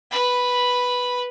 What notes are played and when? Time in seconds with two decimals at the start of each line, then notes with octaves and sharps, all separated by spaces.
0.11 B4 B5